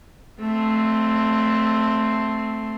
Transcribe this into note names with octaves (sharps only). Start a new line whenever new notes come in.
A3 C4